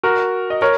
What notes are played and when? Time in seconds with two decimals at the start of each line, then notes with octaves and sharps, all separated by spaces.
0.03 F#4 A#4
0.50 D#5
0.62 A#4 C#5